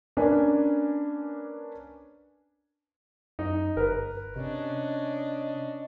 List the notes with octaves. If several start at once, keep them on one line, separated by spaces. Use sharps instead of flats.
A#3 C#4 D4 B4 G#5
F#2 D#4
G1 A#4 B4
C3 C#4 D4 D#5